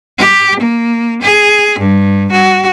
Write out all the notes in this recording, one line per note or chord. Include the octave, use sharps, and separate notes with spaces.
G4
A#3
G#4
G2
F#4